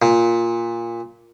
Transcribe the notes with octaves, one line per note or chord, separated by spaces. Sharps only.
A#2